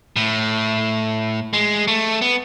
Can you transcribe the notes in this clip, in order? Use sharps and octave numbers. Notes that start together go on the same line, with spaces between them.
A2
G#3
A3
B3